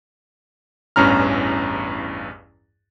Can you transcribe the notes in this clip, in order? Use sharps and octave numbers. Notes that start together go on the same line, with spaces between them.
A1 E2 G2 C#4 A#5 F6